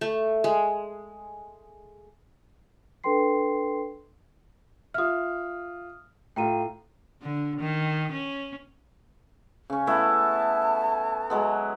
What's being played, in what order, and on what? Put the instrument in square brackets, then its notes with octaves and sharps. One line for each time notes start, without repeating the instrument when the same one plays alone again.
[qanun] A3
G#3
[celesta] D4 A4 B4 G5 C6 C7
[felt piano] F4 E5 [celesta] D#6 F6
[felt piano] A2 F4 [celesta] G5 A#5 D#7
[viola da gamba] D3
D#3
C#4
[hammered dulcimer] C#3 C#4
[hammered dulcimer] A3 B3 E4 [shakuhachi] A5
[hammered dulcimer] F#3 G#3 B3